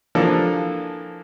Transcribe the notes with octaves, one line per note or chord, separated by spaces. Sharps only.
E3 F3 A#3 D4 A4